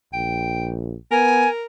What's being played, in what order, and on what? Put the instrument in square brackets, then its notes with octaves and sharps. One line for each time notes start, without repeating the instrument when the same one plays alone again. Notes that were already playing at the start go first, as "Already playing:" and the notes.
[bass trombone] A#1 [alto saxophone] G5
[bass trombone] B3 [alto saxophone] A#4 [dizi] G#5